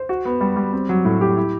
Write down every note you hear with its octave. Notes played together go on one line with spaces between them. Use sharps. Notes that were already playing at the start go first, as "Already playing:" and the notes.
Already playing: C5
F#4
B3
G3
G3
C4
F#3
A2
G4
E4